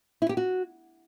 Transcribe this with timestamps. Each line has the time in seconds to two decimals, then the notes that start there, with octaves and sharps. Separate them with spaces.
0.22 E4
0.29 G4
0.37 F#4